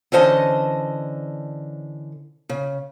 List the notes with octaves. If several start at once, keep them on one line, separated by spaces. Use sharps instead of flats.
D3 E3 C#4 C5 D#5 A5
C#3